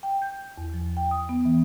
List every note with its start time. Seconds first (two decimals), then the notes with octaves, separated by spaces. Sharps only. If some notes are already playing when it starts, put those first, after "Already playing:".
0.03 G5
0.22 G6
0.58 E2
0.74 F3
0.97 G5
1.11 D#6
1.29 B3
1.45 E3